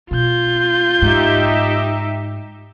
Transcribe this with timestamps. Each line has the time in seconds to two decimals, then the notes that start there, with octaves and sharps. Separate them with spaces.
0.11 B2 F4 G6
1.02 G#2 D#4 G4 E5